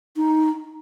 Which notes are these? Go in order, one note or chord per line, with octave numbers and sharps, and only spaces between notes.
D#4